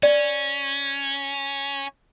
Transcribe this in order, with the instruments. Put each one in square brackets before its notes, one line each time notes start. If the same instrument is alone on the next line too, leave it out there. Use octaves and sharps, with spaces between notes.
[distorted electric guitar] C#4 [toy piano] D5